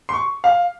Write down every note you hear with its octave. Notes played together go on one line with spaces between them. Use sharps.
C6
C#6
F5